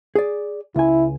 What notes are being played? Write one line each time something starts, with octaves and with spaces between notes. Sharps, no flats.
G#4 D5
C#2 E4 G#5